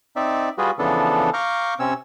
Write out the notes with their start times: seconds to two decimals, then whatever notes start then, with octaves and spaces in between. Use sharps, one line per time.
0.16 C4 D#4 D5 E5
0.58 G3 F4 F#4 G#4 B4
0.79 C#3 E3 F3 B3 D4 A4
1.34 F5 A#5 C#6 D6 F6 G6
1.80 C3 C4 C#4 C#5 E6